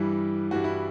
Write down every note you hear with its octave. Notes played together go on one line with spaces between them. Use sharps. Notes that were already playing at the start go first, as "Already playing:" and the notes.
Already playing: G2 E3 G3 E4
G2 E3 G3 F#4
E4